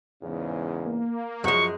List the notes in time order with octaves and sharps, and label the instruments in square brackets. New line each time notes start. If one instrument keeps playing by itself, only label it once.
[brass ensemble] E2 G#2 C#3
[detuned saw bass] A#3
[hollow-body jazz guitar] F#2 G#3 [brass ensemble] F3 F#3 [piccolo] C#6